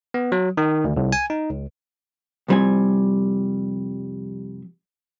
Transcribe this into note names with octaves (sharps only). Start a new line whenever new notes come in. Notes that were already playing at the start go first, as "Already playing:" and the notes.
B3
F#3
D#3
D2
C2
G#5
D#4
C#2
C2 F2 G3 C4 E4 G#5